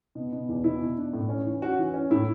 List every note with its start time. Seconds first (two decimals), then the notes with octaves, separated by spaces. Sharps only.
0.15 B2
0.32 B2
0.49 E2
0.64 B2 E4
0.81 B2
0.97 D4
1.13 A2
1.29 C#4
1.46 E3
1.62 C#4 F#4
1.79 E3
1.94 C#4
2.10 A2 E4